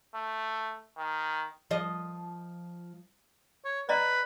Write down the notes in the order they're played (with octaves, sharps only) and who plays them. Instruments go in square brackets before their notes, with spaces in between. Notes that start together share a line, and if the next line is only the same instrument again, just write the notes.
[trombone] A3
D#3
[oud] F3 D#5
[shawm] C#5
[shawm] B4 [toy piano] D5 D#5 A#5